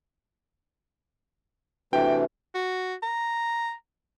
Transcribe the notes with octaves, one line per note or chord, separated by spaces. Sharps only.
C3 E3 A3 D4 F#4 B4 G5
F#4
A#5